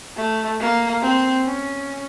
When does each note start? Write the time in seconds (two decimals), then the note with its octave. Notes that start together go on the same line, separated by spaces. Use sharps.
0.16 A3
0.60 A#3
1.02 C4
1.45 C#4